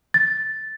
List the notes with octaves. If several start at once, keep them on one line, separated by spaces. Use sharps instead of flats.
A6